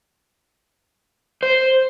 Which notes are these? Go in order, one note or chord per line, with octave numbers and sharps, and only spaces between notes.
C5